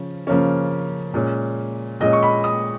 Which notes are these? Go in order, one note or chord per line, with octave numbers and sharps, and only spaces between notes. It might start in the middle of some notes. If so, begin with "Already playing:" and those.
Already playing: C#3 F3 C#4
C#3 F3 A#3 C#4
A#2 G#3 C#4
A#2 G#3 C#4 D#5
C#6
B5
D#6